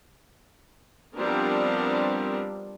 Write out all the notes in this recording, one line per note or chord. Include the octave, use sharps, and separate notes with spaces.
F3 G3 B3 C4 D4 A#4